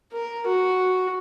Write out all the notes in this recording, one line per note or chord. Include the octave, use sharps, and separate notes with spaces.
A#4
F#4